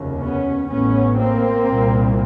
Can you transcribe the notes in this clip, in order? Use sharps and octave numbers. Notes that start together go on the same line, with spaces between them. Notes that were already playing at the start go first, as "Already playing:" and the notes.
Already playing: F1 D#2 C#3
B3 C#4
A1 A2 B3 C#4
A#3 C4
C2 A#2